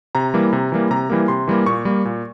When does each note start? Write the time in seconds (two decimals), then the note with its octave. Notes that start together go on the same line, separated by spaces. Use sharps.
0.15 C3 A#5
0.34 E3 G3 A#3
0.53 C3
0.72 E3 G3 A#3
0.90 C3 A#5
1.10 E3 G3 A#3
1.28 C3 C6
1.48 E3 G3 A#3
1.66 A#2 C#6
1.85 G3 A#3
2.05 A#2